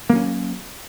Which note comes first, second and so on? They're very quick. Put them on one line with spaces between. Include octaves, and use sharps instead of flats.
A#3 F#3 C#4